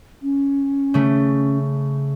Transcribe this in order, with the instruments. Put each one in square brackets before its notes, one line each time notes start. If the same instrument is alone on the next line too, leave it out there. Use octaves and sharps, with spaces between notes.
[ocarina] C#4
[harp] C#3 A3